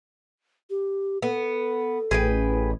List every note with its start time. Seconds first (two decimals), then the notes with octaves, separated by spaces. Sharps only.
0.70 G4
1.22 B3 A4
2.11 A1 G#4 B4 G5